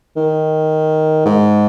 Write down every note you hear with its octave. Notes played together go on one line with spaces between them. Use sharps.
D#3
G#2